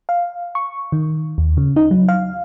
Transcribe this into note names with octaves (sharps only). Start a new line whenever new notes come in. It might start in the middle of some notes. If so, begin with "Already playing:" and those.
F5
C#6
D#3
D#2
C#3
D#4
F#3
F5